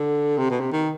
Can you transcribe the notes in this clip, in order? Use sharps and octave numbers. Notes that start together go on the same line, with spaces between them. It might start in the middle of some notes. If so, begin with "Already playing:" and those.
Already playing: D3
C3
B2
C3
D#3